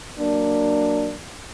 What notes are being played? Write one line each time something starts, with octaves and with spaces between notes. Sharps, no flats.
F#3 A#3 D4